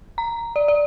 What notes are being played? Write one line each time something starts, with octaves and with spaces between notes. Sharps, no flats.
A#5
D5
D5